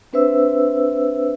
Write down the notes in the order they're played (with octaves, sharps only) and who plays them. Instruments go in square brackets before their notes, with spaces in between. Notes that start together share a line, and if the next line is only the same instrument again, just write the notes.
[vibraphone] C4 D4 B4 C5 E5 E6